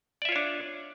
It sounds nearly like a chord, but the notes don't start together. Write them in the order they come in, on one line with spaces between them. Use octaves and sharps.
D5 E5 F4 C#5 D4